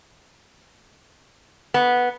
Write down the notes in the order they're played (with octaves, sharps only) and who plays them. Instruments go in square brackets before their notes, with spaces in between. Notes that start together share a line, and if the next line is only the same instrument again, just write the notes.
[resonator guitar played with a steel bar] B3